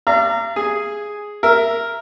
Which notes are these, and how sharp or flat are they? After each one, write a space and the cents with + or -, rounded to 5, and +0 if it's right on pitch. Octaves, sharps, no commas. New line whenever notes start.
D5 +0 F5 -45 A#5 -20
G#4 +0 G#5 -5
A#4 +0 E5 +15